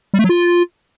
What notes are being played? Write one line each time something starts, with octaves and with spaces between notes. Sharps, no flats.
G3
A3
F#3
F4